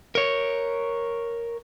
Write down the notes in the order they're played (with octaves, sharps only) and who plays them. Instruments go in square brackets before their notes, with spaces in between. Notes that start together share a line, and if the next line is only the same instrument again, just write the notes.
[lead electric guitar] A#4 C#5